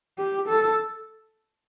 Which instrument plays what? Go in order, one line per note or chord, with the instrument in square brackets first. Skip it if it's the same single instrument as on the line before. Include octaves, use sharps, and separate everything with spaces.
[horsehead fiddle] G4
A4